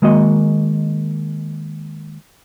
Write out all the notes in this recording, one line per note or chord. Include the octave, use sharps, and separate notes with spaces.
D#3 G#3 A#3 F#4 D#5